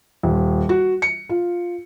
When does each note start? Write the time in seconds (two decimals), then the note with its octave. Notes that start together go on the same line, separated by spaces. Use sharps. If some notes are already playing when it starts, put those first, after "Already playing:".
0.23 D#1
0.69 F#4
1.02 C#7
1.29 F4